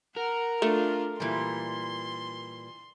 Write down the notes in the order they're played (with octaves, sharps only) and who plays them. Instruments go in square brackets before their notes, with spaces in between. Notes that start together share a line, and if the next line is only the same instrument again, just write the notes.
[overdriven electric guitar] A#4 [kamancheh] F#5
[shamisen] A3 [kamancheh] D4 F4
[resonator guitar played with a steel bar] A#2 E3 G3 [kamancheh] C6